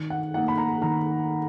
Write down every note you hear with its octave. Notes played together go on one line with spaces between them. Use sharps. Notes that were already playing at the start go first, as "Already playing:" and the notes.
Already playing: D#3
F#5
A#3 D#4 F#5
B5
A#5
D#3 A#5